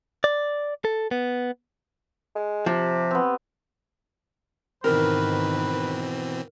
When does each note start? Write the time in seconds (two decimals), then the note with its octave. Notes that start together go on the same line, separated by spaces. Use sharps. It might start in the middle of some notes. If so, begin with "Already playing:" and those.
0.24 D5
0.85 A4
1.11 B3
2.36 G#3
2.66 C3 F3 G4
3.11 B3 C4
4.84 G#2 B2 D#3 E3 C4 A#4 B4